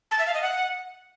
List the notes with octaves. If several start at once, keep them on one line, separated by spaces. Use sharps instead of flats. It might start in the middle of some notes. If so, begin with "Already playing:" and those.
A5
E5
F5
D#5
F#5